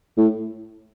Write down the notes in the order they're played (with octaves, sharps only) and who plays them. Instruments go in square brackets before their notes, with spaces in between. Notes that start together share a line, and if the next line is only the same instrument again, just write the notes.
[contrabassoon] A2